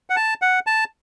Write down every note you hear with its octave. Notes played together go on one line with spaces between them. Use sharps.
F#5
A5
F#5
A5